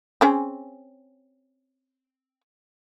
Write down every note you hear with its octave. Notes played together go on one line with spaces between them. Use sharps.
C4 C#4 G#4